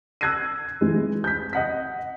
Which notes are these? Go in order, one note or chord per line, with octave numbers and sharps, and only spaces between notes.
E6 F#6 G#6 A#6 C7 D#7
E3 G#3
G6 B6
D#5 F#5 B6